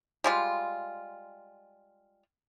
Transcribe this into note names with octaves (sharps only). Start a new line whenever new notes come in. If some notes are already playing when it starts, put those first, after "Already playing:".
G3 G#3 F4